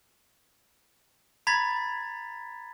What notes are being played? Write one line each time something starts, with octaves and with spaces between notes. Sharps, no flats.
A#5 B5 G#6 A6 B6